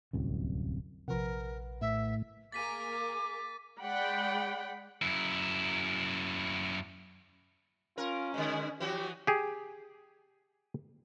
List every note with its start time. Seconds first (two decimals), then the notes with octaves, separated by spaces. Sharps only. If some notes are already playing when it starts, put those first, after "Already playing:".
0.13 D1 C2 F#2
1.08 A#1 C3 F3 A#4 B4 F#5
1.81 A2 E5
2.52 A#3 G#4 A#4 D6 A6 B6 D#7
3.80 G#3 D5 F#5 G5 B5
5.02 F#2 E4
7.98 C#4 F4 A#4
8.34 B2 D3 G#3
8.80 E3 F3 F#4 G4
9.27 G4 G#4